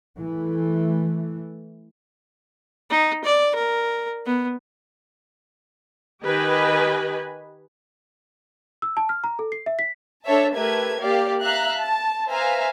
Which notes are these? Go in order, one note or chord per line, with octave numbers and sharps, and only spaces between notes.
E3 A3
D#4
D5
A#4
B3
D#3 G4 B4 D#5 G#5 B5
E6
A5
F6
A#5
A4
C7
E5
B6
D4 A4 C#5 E5 A5
A3 G4 A#4 B4 E5 G#6
A#3 G4 D5 F5
E5 F5 A#5 F#6
A5
B4 C5 E5 F5 G#5 A#5